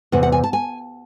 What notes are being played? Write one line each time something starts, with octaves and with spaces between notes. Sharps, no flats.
E2 C3 F#5
F#5
G#5
A5
G#5